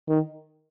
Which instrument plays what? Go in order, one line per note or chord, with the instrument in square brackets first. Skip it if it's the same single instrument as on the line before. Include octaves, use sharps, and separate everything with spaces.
[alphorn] D#3